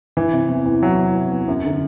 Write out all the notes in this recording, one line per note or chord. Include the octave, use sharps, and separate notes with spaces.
E3
C3
E2
E2
E3 F#3
C3
E2
E2
F#2
D3